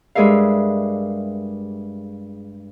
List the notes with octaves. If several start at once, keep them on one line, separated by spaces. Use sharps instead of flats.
G2 G#3 G#4 A#4 E5 F5